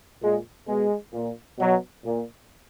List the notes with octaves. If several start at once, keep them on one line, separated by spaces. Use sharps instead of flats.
A#2 G#3
B2 G#3
A#2
B2 F#3
A#2